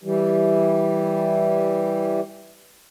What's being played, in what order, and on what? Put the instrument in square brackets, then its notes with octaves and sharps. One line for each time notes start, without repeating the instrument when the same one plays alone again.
[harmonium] E3 G3